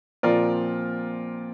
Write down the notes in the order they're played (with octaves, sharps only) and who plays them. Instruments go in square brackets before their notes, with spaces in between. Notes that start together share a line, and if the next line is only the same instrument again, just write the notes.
[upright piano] A#2 F3 C4 F4 A#4 D5